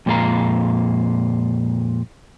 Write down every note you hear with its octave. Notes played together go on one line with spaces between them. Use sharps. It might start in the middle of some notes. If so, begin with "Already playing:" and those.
F2 A#2 G#3 C4 F5 A#5